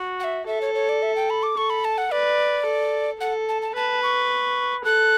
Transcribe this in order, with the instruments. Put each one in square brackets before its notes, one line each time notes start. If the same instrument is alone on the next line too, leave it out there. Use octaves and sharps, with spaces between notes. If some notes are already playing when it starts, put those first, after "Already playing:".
Already playing: [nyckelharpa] F#4
[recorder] F#5
E5
[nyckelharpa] A4 [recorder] E5
[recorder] C#5
C#5
D5
E5
G5
B5
D6
[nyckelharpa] A4 [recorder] C#6
[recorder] B5
A5
F#5
[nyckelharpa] B4 [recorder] D5
[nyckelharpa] A4
[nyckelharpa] A4 [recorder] F#5
[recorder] A5
A5
[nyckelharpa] B4 [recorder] A5
[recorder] C#6
[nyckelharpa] A4 [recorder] F#6